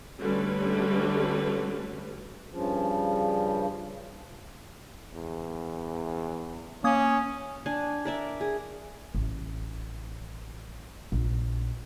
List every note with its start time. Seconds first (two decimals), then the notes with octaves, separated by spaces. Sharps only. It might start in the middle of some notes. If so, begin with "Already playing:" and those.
0.19 D3 G3 A3 C#4 F#4 B4
2.50 G2 C#3 F3
5.13 E2
6.84 A#3 C#4 D#6 G#6
7.66 D4 G#5
8.05 A#4 D5 E5
8.41 G#4
9.15 A1
11.12 A#1